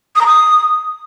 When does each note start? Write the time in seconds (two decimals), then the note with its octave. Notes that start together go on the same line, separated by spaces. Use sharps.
0.16 D#6
0.21 A#5
0.26 D#6